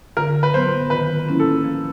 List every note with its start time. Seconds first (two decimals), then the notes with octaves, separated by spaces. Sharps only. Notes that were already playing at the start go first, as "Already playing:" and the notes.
0.17 D3 A#4
0.43 B4
0.53 F#3 B3 C5
0.90 D#3 B4
1.28 F#3 A#3 C#4 E4
1.40 A4
1.64 F3